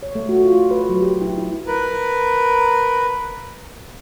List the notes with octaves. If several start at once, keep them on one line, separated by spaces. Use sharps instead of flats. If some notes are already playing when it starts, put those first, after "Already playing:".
C#5
A3
F#4
F4
A3
B4
F#3
G4
E4
E4
A#4 B4